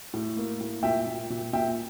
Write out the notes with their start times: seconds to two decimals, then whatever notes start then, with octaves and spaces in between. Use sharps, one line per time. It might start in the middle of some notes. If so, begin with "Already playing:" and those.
0.14 A2
0.37 A#3
0.60 A2
0.83 A#2 E5 G5
1.07 A#2
1.30 A#2
1.53 A#2 E5 G5